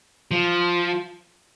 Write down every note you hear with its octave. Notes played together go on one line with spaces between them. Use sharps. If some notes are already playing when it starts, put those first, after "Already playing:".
F3